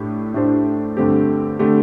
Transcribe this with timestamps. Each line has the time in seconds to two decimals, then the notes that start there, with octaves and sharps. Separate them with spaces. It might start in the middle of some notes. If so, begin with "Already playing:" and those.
Already playing: A2 A3 D4 G4
0.34 A2 A3 D4 G4 C5
0.97 G2 D3 A3 C4 G4
1.59 D3 A3 C4 G4